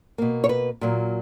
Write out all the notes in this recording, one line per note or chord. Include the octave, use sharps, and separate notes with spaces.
B2 A#3
C#5
B4
A#2 F#3 A#3